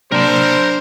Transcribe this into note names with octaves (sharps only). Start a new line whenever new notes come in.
C3 F#3 A#3 D4 A#4 C5 G5 A5